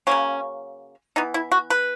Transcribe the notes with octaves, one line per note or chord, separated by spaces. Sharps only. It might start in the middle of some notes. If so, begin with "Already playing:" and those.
C#3 F#3 A#3 C#4
E3 B3 D#4
E4
F#4
B4